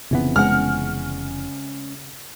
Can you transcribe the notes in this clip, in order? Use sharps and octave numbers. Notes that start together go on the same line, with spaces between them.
F1 C#3 E3 B3 C4
G#3 C#4 F#5 F6